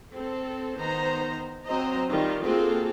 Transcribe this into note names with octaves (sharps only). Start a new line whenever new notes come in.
C4 A4
D#3 B3 D#4 C5 A#5
F#3 C4 C5 D#5 A#5
D#3 G3 F4
A#3 C4 F4 F#4 G#4 A4